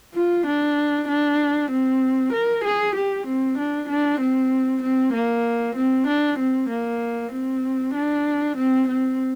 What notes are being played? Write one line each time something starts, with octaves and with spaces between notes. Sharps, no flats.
F4
D4
D4
C4
A#4
G#4
G4
C4
D4
D4
C4
C4
A#3
C4
D4
C4
A#3
C4
D4
C4
C4